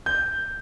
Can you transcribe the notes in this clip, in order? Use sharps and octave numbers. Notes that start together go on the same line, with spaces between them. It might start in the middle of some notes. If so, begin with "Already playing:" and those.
G6